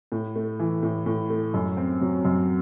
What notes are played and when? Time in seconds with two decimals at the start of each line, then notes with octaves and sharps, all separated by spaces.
0.12 A2
0.36 A3
0.59 E3
0.83 A2
1.06 A2
1.30 A3
1.54 F#2
1.77 C4
2.01 F#3
2.25 F#2